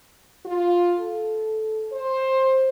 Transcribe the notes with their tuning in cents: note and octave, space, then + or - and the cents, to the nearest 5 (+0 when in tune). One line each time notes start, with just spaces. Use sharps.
F4 +10
A4 -15
C5 +15